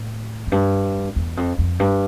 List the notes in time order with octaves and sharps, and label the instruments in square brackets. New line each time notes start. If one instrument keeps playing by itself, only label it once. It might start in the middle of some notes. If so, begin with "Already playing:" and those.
Already playing: [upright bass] A2
F2
G2
E2
F2
F2
G2